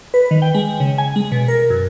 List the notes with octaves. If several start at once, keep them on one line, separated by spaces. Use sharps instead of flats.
B4
D#3
G5
G#3
C#3
G#5
G#3
B2
A#4
F#2